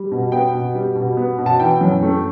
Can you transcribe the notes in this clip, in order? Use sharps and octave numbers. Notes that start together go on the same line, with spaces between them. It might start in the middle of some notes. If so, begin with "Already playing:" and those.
Already playing: G3
B2
B3 G5
B2
G3
B2
B3
B2
A5
E3 G5
F#2
A3